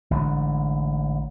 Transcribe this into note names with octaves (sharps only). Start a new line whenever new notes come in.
A1 D3 F#3 G#3